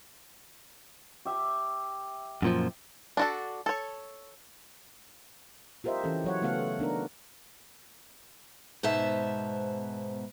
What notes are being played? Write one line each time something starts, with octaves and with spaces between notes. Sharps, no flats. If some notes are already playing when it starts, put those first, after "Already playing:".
G4 E5
F#2 A#2 F3
D4 F#4 A4
A4 C#5
F4 G4 A#4 C5 D#5 E5
E3 C#4 G4 A4
F#3 C#5 F#5
C#3 A3 B3 A4 F5 F#5
B3 D4 D#4 A#4
G#2 B2 B3 C5 E5 A5